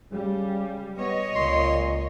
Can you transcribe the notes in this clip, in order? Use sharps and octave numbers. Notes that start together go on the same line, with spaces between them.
C#3 G3
B3 C#5 D#5
C#2 A#2 C6